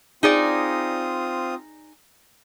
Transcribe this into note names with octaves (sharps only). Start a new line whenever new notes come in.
C4 D#4 F4 G#4 D5 D#6